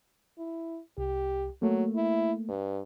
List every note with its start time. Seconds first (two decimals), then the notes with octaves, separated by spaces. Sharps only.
0.38 E4
0.98 C2 G4
1.62 F#3 A3 A#3
1.96 E4
2.49 G2